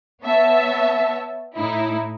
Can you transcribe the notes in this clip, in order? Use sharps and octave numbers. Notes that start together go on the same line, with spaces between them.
B3 C#5 E5 A5
A2 D#4 E4